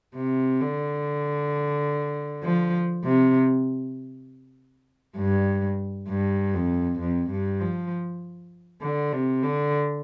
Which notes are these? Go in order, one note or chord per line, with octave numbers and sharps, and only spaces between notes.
C3
D3
F3
C3
G2
G2
F2
F2
G2
F3
D3
C3
D3